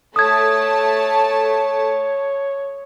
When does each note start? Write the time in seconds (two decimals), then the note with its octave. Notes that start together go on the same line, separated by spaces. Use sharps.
0.16 A3 C#5 A5 D#6 G#6